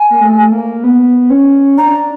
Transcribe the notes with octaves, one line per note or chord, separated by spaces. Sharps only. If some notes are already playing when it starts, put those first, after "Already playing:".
Already playing: G#5
A#3
A3
A#3
B3
C#4
D4 A#5